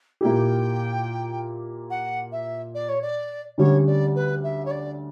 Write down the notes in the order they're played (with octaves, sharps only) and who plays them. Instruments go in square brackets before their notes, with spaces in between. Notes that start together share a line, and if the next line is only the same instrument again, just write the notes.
[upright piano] A#2 A#3 E4 G4 [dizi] G5
[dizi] F#5
E5
D5
C#5
D5
[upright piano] D2 D3 G3 C#4 [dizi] C#5
[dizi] D5
B4
E5
C#5
D5